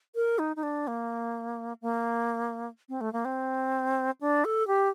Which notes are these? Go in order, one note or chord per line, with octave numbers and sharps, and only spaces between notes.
A#4
D#4
D#4
D4
A#3
A#3
C4
A3
A#3
C4
D4
A4
G4